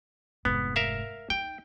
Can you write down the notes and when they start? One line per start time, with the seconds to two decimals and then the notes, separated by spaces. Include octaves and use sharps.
0.45 F1 G#2 B3
0.76 A#4 E5 F5
1.30 D#4 G5